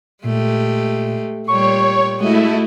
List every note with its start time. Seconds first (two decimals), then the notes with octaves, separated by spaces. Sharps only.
0.24 A#2 G#3 A3 G4
1.48 A#2 G3 C#5 C#6
2.21 G#3 A3 E4 F#4 D#5